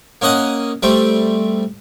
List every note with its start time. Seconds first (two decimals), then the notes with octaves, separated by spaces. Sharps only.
0.21 A#3 C#4 D#5 F#5 D#6
0.83 G3 A3 C4